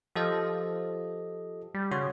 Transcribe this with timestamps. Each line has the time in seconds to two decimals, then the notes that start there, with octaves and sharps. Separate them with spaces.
0.15 F3 G4 A4 D#5
1.74 G3
1.91 C#3 F#4 C#5 C6